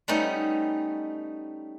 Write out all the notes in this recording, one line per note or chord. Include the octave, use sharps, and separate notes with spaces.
G3 A3 B3 C#4 D#4